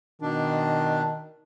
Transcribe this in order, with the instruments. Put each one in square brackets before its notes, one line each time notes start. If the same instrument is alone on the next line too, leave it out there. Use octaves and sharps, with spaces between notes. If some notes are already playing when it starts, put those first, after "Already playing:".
[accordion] B2 D4 [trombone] D#3